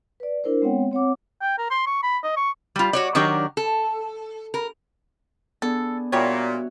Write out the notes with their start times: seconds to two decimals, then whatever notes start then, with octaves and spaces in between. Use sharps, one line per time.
0.20 B4 D5
0.44 D4 E4 A#4 C5
0.62 G#3 B3 C4 C#5 F#5 G5
0.91 C4 C#5 F#5 D6
1.41 G5
1.58 A#4
1.70 C6
1.86 C#6
2.03 B5
2.23 D#5
2.36 C#6
2.76 G3 F4
2.93 F#4 C#5 D5
3.15 D#3 F#3 D4 G4 A#4 C#5
3.57 A4
4.54 A#4
5.62 B3 D4 G#4 A4
6.12 A#2 G3 F#4 C#5 E5 F#5